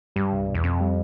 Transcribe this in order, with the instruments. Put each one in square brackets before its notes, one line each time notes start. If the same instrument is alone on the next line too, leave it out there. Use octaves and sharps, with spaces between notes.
[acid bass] G2 [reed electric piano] G3
[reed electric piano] C2
B2
[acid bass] E2
[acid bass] F2 [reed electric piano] C4
[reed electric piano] G3